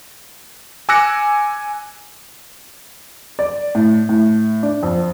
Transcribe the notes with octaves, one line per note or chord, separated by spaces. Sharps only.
G#5 D6 E6 F#6 A#6 C#7
D5
A2
A2
D4
F2